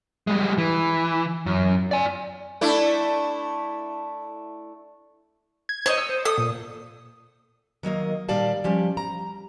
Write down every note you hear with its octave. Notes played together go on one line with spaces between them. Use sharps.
G3 G#3
E3
F#2
D5 G#5
A3 D4 E4
G#6
C5 C#5 D#5
E6
C5
A4 D#6
A#2
D#3 F#3 A#3 D#5
A#2 D#3 G3 D5 F5 A5
F3 G3 C#4
A#5